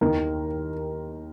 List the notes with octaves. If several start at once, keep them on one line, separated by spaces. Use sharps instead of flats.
D#2 D#3 A#4